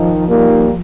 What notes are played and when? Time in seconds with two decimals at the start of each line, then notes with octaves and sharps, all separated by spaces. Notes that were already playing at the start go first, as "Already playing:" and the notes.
Already playing: D#3 F3 D#4
0.26 A#2 G3 A#3 D#4